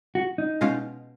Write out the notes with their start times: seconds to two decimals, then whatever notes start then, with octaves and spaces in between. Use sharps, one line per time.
0.15 F#4
0.38 D#4
0.61 B2 G#3 C#4 F4